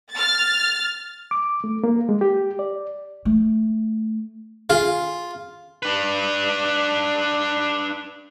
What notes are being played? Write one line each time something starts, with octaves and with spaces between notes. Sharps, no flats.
F6 A6
D6
A3
A#3
G#3
G4
D5
A3
F4 G#4
D4 B4